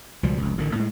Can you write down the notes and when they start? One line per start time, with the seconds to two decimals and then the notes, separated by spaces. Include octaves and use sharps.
0.23 C#2 B2 F3 G3
0.38 F1 C#2
0.58 A1 D3 D#3
0.75 A2 G#3